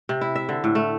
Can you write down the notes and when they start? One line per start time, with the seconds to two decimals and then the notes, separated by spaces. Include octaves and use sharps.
0.09 C3
0.21 E4
0.35 E5
0.49 D3
0.64 A2
0.75 A3